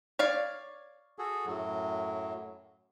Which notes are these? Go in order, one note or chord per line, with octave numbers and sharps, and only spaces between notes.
C#5 D5 F5
F#4 G#4 A4
F#2 A2 F#3